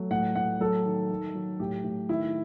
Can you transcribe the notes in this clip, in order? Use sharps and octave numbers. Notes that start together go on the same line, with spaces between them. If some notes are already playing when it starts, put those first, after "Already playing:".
Already playing: F#3 A3
A2 F#5
A2 F#5
F#3 A4
D#3
D#3
F#3
A2 G4
A2
D#3 E4